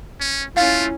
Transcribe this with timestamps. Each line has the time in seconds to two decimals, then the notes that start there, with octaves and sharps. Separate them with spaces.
0.20 C#4
0.56 A3 C#4 E4 F4 F5